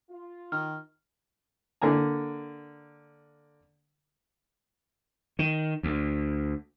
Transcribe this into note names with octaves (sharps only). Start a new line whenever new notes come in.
F4
D#3 F6
D3 A#3 G#5 A#5
D#3
D2